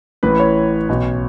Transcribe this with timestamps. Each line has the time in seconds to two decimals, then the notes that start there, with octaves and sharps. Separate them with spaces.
0.23 A1 A2 E3 B4
0.40 C#5
0.89 B1 B2